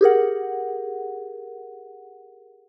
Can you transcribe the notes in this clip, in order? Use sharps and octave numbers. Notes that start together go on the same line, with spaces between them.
G4 G#4 A#4 F#5